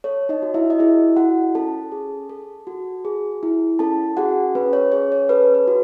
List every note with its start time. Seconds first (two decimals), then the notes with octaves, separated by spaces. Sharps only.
0.04 A4 C#5
0.29 D#4 D#5
0.42 F#4
0.54 E4 E5
0.70 D#5
0.79 E4 G#4 E5
1.17 E4 F#4 F#5
1.55 C#4 A4 A5
1.92 G#4
2.30 A4
2.67 F#4
3.05 G#4
3.43 E4
3.79 C#4 A4 A5
4.17 F#4 G#4 F#5
4.55 C#4 B4
4.73 C#5
4.92 G#4 C#5
5.12 C#5
5.29 A4 B4
5.54 B4
5.68 F#4